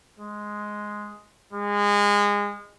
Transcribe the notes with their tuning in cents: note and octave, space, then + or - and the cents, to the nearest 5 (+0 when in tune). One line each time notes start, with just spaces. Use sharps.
G#3 +5
G#3 -25